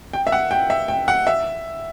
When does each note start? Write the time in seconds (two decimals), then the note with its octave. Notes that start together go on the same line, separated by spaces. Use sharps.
0.13 G5
0.27 E5
0.32 F#5
0.51 G5
0.70 E5
0.88 G5
1.08 F#5
1.27 E5